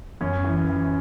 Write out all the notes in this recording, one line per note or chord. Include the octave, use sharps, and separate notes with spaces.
F#2 C#4
E3
E3